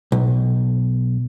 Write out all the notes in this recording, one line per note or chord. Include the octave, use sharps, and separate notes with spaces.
B1